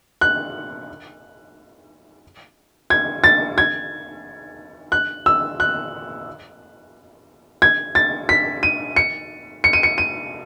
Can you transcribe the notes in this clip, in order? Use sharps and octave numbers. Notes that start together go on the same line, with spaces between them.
F#6
G#6
A6
G#6
F#6
E6
F#6
G#6
A6
B6
D#7
C#7
C#7
D#7
C#7
D#7